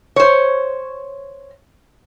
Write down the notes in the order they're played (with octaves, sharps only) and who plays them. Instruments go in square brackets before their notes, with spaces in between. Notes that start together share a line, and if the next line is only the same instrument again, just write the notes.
[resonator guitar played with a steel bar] C5 C#5